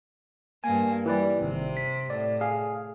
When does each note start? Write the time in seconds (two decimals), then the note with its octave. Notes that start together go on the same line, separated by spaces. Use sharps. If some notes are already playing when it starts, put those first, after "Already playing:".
0.64 G2 A#3 G#5
1.06 E3 G3 B4 D5
1.41 G#1 C3
1.77 B6
2.10 A2 D5
2.41 G#4 F5